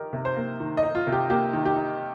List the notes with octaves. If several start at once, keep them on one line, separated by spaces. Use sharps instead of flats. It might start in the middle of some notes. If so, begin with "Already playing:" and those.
Already playing: D#3 D#4 G4 A#4
C3
C5
A#3
D#3
D#5
D#4
F4
C3
G4
A#3 G4
D#3
G4
D#4